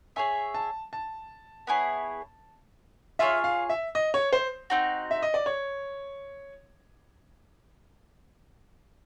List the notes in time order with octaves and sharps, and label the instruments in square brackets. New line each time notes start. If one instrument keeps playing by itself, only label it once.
[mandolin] G#4 C#5 E5 [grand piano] G#5
[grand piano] A5
A5
[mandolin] B3 E4 G#4 C#5
[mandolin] F4 G#4 C#5 [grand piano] E5
[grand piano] F5
E5
D#5
C#5
C5
[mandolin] C4 D#4 F#4
[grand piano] E5
D#5
D5
C#5